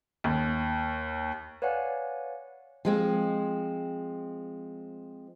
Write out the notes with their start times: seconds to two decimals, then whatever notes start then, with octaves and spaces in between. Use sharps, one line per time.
0.24 D#2
1.62 B4 C#5 D5 F5 F#5 G#5
2.85 F3 G#3 C4